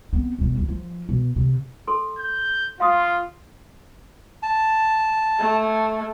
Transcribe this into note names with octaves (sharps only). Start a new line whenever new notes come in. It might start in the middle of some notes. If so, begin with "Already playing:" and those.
B3 C4
F1 B2
D2 E3
F3
B2
C3
A4 C6
G6
F4 F5 C6 D#6
A5
A3